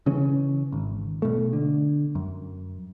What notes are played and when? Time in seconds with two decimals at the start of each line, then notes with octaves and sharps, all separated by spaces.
0.06 C#3 E3 C#4
0.72 G#1
1.22 B2 A3
1.53 D3
2.15 F#2